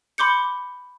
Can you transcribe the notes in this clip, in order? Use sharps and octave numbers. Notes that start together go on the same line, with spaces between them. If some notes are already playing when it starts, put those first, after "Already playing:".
B5 C6 D6 G6 C#7